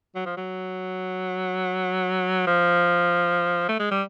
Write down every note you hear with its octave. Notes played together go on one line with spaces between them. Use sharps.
F#3
F3
F#3
F3
A3
G#3
G3